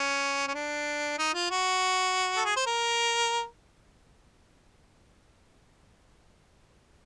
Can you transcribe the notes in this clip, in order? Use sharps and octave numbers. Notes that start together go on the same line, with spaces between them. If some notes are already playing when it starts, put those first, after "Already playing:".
Already playing: C#4
C#4
D4
D#4
F4
F#4
A4
G#4
C5
A#4